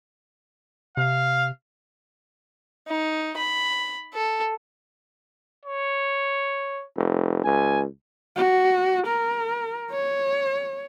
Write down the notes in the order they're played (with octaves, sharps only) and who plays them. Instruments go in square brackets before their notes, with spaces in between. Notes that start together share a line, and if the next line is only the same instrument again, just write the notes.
[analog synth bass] C3 [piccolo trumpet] F5
[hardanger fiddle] D#4
B5
A4
[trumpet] C#5
[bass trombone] F1
[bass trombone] C#2 [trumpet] G#5
[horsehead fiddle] F#4
A#4
C#5